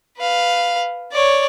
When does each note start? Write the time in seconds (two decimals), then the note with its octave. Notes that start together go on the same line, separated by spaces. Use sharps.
0.18 B4 F5
1.12 C#5 D5